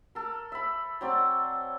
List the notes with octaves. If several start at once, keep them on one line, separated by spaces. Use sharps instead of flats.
A4 A#4
E5 B5
F#3 C4 D5